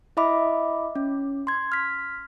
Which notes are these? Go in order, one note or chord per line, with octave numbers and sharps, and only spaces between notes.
E4 D#5 E5 B5 D6
C#4
C6 G#6
F6 B6